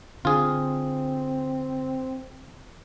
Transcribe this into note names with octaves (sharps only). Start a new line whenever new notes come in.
D3 C4 F4 G#4